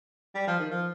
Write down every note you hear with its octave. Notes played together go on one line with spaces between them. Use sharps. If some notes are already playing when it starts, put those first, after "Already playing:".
G3
F3
D#3
F3